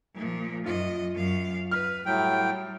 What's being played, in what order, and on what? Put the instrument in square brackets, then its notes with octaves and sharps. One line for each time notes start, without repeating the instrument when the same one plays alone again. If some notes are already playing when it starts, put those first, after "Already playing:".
[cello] A#2 F3
[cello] F#2 D#5 [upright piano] F4
[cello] F#2 F5
[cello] B4 [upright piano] F6
[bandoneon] A2 F#3 G5 [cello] G3